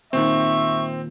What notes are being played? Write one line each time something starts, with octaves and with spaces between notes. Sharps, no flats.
D#2 A#2 D#3 C4 E5 C#6